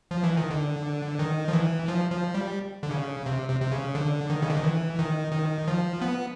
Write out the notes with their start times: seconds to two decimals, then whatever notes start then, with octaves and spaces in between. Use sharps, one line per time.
0.11 F3
0.23 E3
0.37 D#3
0.50 D3
1.19 D#3
1.48 F3
1.53 E3
1.88 F3
2.11 F3
2.35 G3
2.83 D3
2.91 C#3
3.26 C3
3.49 C3
3.61 C3
3.72 C#3
3.95 D3
4.30 D#3
4.42 C#3
4.50 D3
4.57 D#3
4.64 E3
4.99 D#3
5.32 D#3
5.68 F3
6.01 B3